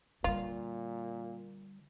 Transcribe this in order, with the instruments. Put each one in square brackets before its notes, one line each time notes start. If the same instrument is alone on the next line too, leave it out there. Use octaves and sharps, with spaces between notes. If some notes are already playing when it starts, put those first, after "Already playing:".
[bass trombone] A#2 [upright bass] D3 G3 [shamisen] F4